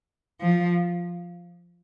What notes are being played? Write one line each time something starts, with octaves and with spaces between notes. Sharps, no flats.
F3